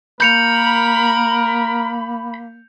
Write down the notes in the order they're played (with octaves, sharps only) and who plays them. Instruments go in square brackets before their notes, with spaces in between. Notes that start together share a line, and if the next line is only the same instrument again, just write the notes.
[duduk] A#3 [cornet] A#4 [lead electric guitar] B5 [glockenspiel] G6 C#7 F7